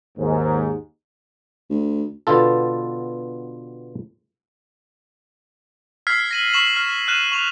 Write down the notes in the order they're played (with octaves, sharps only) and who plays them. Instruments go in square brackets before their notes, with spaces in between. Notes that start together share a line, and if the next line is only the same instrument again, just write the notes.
[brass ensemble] D#2 G#2
[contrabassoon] D2
[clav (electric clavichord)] B2 D3 B3 F4 A4
[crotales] E6 F6 G#6 B6 C7
A#6 D#7 F#7
C#6 B6 E7 F#7
F6
F6 F#6 D#7 E7
C#6 F7 F#7